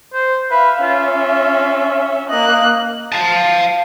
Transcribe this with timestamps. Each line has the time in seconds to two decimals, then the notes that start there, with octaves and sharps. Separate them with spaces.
0.14 C5
0.51 B4 E5 F5
0.83 C#4 F4 E5
2.30 A#3 D#5 F#6
3.12 F5 A5